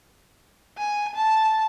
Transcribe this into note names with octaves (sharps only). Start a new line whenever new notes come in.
G#5
A5